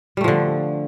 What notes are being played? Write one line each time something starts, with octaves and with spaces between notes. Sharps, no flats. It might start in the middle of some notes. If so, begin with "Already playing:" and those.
D3 F3 G3 A3